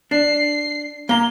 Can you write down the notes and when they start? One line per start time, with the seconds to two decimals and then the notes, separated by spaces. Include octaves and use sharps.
0.11 D4 C7
1.09 A#3 A#5 G7